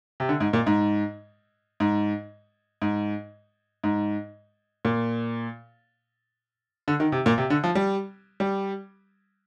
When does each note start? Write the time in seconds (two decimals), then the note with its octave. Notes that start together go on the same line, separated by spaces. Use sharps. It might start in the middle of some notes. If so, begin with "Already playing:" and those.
0.20 C3
0.29 D3
0.40 G#2
0.53 A#2
0.67 G#2
1.80 G#2
2.82 G#2
3.84 G#2
4.85 A#2
6.88 D3
7.00 D#3
7.12 C3
7.26 A#2
7.38 C3
7.50 D3
7.64 F3
7.75 G3
8.40 G3